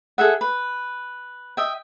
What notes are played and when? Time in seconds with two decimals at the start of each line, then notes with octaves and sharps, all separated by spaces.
0.18 G#4 A4 E5 F#5
0.41 B4
1.57 D#5 E5 G5